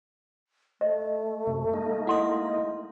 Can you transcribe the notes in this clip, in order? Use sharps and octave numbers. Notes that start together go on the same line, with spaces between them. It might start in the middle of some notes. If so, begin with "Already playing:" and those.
A3 D#5
F#2 C3
G#3 A#3 D#4
E4 D#5 F#5 C6